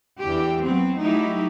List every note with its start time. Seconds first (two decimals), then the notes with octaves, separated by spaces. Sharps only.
0.19 E2 D3 E3 G4
0.63 F#3 B3 C4
0.99 F#3 G3 A3 D#4 E4 G4